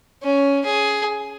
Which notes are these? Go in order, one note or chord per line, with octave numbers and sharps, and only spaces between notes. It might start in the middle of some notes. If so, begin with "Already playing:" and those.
C#4
G#4